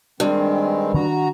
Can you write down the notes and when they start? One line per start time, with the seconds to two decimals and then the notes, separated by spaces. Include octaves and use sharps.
0.20 G2 D#3 G#3 C4
0.94 D#3 C#4 D4 F#4 A#5